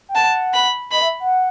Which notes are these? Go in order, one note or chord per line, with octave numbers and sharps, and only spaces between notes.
G5
F#5 A5
B5
D#5 B5
E5
F#5